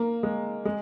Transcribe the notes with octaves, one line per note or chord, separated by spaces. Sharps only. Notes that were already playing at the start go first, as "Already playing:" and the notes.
Already playing: A#3
G#3
G#3